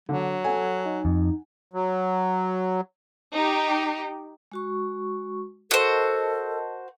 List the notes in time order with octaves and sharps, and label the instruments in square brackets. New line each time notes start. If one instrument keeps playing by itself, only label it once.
[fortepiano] D3 [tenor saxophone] F#3
[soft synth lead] A4 [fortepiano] F#5 G#5
[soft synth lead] D#4
[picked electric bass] F2
[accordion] F#3
[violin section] D#4 G4
[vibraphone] G#3 F#4 C#6
[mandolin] F#4 C5 [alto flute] A4 [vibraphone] A#4 D#5 A5